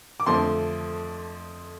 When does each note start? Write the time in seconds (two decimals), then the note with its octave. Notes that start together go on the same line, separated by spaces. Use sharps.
0.20 D6
0.26 F2 D3 F3 A3 C6